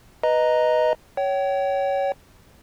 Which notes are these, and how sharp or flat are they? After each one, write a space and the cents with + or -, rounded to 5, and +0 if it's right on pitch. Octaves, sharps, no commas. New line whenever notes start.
B4 +0 D#5 +0 A#5 +0
C#5 +10 G5 -35